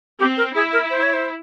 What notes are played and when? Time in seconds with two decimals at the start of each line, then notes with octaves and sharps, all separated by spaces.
0.19 C4 G4
0.37 A#4
0.55 E4 G#4
0.73 A#4
0.90 C5
1.02 C#5
1.13 C5